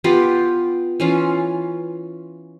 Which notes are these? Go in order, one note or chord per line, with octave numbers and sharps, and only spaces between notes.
B3 F4 G4
E3 C#4 F4